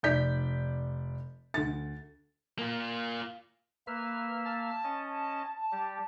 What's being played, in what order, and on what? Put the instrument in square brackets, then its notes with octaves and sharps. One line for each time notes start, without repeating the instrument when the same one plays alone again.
[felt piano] F1 D5 G6 B6
D2 A6
[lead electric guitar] A#3 F4
[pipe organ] A#3 E5 F6 [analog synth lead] B4
[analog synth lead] A5
[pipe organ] C#4 D#5
G3 G4